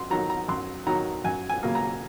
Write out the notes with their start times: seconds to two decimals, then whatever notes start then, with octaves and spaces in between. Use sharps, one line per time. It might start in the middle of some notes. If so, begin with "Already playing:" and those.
Already playing: F#2 C6
0.10 D#3 F#3 A#5
0.30 A#5
0.49 F#2 C6
0.87 D#3 F#3 A#5
1.24 F#2 G#5
1.49 G#5
1.63 C#3 F#3 A#3
1.75 A#5